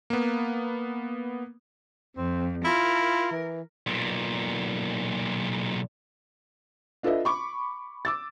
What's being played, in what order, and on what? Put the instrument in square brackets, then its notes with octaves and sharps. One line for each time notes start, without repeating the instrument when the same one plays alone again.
[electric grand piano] A#3 B3
[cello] F2 [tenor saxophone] C4
[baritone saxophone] E4 [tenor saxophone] F4 [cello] A#4
[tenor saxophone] E3
[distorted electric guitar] B1 A#2
[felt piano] D4 F4 A4 B4 D#5 E5
B5 C#6 D6
D6 E6 A6